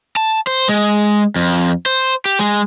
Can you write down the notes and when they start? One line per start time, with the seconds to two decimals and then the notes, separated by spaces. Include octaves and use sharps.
0.16 A5
0.47 C5
0.69 G#3
1.36 F2
1.86 C5
2.25 G4
2.39 G#3